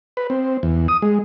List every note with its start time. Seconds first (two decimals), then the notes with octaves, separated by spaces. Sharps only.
0.17 B4
0.30 C4
0.63 E2
0.88 D#6
1.02 G#3